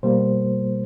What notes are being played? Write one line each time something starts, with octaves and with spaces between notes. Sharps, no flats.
B2 G3 A#3 C5